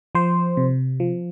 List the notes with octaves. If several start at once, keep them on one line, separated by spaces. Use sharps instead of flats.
F3 C5
C3
F3